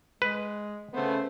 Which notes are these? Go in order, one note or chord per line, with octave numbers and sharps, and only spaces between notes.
G#3 B4
C#3 A3 B3 C5